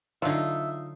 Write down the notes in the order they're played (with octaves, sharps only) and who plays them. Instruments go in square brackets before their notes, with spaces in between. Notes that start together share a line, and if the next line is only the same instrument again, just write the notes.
[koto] D3 F#3 [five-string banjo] D#4 F4 [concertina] E5